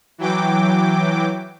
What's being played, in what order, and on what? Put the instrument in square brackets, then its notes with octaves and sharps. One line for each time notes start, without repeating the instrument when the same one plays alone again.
[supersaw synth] E3 F#3 G5 D6